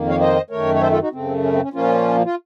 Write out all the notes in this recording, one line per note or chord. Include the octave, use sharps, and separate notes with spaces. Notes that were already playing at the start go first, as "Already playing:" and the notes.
Already playing: F2 D#3 A#3
C#5 F5
C5 D#5
F#2 D#3 A3 A#4 C#5
C#5
A4 C5
F4 A4
D#4 F#4
F#2 C#3 A3 C4
C#4
C4
C#4
A#2 F3 A#3 C#4 F4
F4